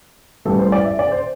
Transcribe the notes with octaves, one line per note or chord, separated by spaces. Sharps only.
A1 A2 E3 G3 A4
C5
D5
E5
D5
C5